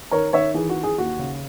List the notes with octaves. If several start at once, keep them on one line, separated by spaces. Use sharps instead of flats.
D#3 A#4 C#5
D#3 C#5 E5
E3 G#4
F#4
E3
G#4
D#2 F#4
C#3